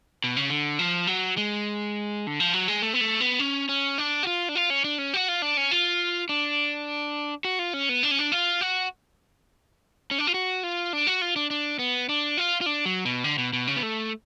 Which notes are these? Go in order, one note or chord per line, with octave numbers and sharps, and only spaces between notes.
B2
C#3
D3
F3
F#3
G#3
D3
F3
F#3
G#3
A3
B3
A3
B3
C#4
C#4
D4
F#4
F4
D4
F4
C#4
D4
C#4
F#4
F4
D4
C#4
F4
D4
F#4
F4
C#4
B3
D4
C#4
D4
F4
F#4
C#4
D4
F4
F#4
F4
D4
F#4
F4
D4
D4
B3
D4
F4
F4
D4
F#3
B2
D3
B2
B2
C#3
B3
A3